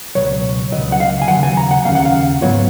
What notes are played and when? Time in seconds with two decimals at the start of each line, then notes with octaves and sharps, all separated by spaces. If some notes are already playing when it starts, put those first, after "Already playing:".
0.15 C#2 B2 F#3 C#5
0.72 C#2 B2 F#3 D#5
0.92 F#5
1.00 F5
1.22 G#5
1.28 D#2 C#3 F#3 F#5
1.43 G#5
1.57 A#5
1.71 F#5
1.85 D#2 C#3 F#3 A#3 F5
1.95 F#5
2.05 F5
2.41 G#2 F#3 B3 F4 C#5